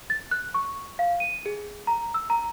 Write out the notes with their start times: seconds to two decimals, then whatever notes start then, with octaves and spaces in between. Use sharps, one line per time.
0.10 A6
0.31 F#6
0.54 C#6
0.99 F5
1.20 D#7
1.46 G#4
1.87 A#5
2.14 E6
2.30 A#5